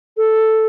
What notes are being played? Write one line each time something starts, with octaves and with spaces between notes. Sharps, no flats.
A4